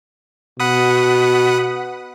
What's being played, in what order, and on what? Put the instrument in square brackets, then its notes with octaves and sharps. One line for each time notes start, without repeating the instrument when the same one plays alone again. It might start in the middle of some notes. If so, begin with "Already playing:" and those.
[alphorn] B2 [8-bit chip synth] F#5 B5 D#6